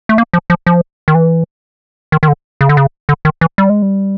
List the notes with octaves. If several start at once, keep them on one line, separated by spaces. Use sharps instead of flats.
A3
A#3
F3
F3
F3
D#3
E3
D#3
D#3
D3
C#3
D3
C#3
D3
D#3
E3
G3
G#3
G3